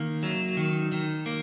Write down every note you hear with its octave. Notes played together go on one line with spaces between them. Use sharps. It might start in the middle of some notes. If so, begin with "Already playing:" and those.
Already playing: D#3 A#3
F#3
D#3
D#3
A#3